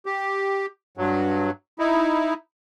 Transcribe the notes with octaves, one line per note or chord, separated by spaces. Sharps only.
G4
G2 F#3
D#4 E4